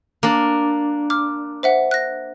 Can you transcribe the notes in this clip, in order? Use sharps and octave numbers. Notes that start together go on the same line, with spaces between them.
A#3 D4
D6 F6
C5 E5 F#5
F#6 A#6